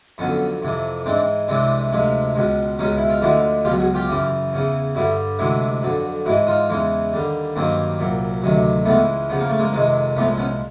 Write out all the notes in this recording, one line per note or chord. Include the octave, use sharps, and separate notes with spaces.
F2 D3 F#3 B3 C#4
F2 C3 E3
G#2 E3 G#3 C4 D4
C2 C3 E3 G#3 C4 D4
D2 C3 F3 G#3
C#2 B2 G#3
C#2 B2 G#3 C#4 D#4
E4
F4
D2 D3 F3 G#3 E4 F#4
C#2 B2 F#3 F4 G4
F#4 G#4
F4 G4
F#2 C#3 E3
E2 C#3 E3
G2 D3 G3 E4 F#4
D2 C3 E3 G#3 E4 F#4
F2 D3 F#3
G#2 E3 G#3 E4 F#4
D#4 F4
E2 C#3 E3 G#3
D#2 D3 G3
G2 D#3 F#3 A#3 C4
C2 A#2 F#3
D2 C3 D#3 F#3
C#2 C#3 E3 G#3 A3 B3
E2 C#3 F3 B3
A#3
A3
G#3 A#3
F2 C3 D#3 G#3
C2 A#2 F3 G#3 A3 B3
B3 C#4